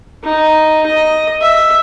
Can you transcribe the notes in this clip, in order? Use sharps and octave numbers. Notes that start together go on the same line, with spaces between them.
D#4
D#5
E5